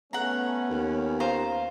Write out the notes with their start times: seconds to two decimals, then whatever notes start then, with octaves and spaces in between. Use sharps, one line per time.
0.13 A3 B3 C#4 F#5 A#5
0.70 D#2
1.20 F4 C5 A#5